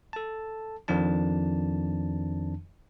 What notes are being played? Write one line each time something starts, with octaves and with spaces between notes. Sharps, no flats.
A4 A5
F2 D#3 F3 D4 A5